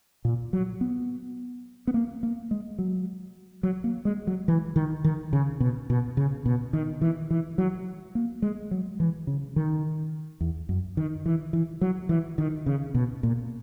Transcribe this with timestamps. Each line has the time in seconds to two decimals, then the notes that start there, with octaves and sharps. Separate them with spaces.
0.25 A#2
0.53 F#3
0.81 B3
1.87 B3
1.94 A#3
2.23 A#3
2.51 G#3
2.79 F#3
3.63 F#3
3.84 A#3
4.05 G#3
4.27 F#3
4.48 E3
4.76 D#3
5.04 D#3
5.33 C#3
5.60 B2
5.90 B2
6.17 C#3
6.46 B2
6.73 D#3
7.01 E3
7.31 E3
7.58 F#3
8.15 A#3
8.42 G#3
8.71 F#3
9.00 E3
9.27 C#3
9.56 D#3
10.41 E2
10.69 F#2
10.97 D#3
11.26 E3
11.53 E3
11.81 F#3
12.09 E3
12.38 D#3
12.66 C#3
12.94 B2
13.23 A#2